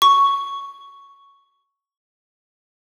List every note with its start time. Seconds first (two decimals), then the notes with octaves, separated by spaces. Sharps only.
0.02 C#6